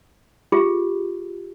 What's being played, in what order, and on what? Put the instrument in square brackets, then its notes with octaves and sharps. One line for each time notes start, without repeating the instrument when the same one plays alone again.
[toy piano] F4 G4 G#4